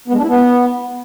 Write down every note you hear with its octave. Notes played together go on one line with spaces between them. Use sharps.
B3
G#3
D4
E4
B3